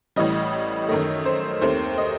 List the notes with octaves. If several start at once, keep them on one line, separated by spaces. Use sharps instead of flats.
A1 A2 E3 G3 D#5
F#2 D#3 A3 D#5
C5
D#2 D#3 A3 C4 C5
D#5